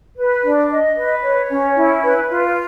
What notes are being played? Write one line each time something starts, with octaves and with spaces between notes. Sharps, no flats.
B4
D4
D#5
B4
C#5
C#4
E4
B4
F4